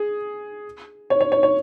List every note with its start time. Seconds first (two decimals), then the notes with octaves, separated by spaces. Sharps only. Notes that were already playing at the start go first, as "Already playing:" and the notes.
Already playing: G#4
1.10 C#5
1.21 C#5
1.32 C#5
1.43 C#5